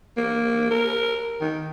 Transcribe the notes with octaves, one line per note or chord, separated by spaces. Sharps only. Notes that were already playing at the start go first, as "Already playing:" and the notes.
A#3
A#4
D#3